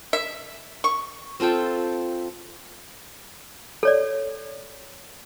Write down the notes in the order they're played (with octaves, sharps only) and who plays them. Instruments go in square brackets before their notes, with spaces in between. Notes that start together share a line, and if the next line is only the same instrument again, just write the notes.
[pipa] E5
C#6
[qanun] C4 F4 A4 G5
[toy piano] A4 C#5 D5